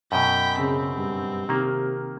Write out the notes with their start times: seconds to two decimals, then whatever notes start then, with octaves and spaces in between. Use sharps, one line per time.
0.12 F#2 B2 G5 B6
0.59 C#3 C4
0.97 G2
1.49 C3 D#3 A#3